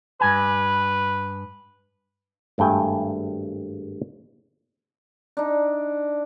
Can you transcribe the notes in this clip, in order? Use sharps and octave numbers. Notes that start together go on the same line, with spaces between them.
G2 B4 G#5
G#1 G2 A3 G5 G#5
D4 D#4